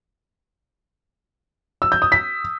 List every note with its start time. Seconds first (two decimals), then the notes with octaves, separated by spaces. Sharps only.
1.82 E6
1.92 G6
2.02 D#6
2.12 B6